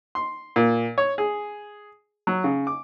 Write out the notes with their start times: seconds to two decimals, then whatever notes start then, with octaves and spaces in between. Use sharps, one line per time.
0.15 C6
0.56 A#2
0.98 C#5
1.18 G#4
2.27 F#3
2.44 C#3
2.67 D6